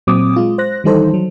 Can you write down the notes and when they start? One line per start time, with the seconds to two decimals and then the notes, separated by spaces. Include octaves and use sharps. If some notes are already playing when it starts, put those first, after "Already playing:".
0.07 A#2 F#3 C4 D6 D#6
0.36 G#3 F4
0.58 C5 F#6 A#6
0.84 D#3 E3 G3 D#4 A4 C5
1.14 F#3